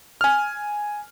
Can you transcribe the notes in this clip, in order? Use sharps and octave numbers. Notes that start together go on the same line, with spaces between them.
G#5 F6